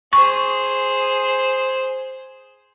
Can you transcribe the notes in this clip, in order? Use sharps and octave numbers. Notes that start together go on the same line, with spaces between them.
G#4 C5 C#6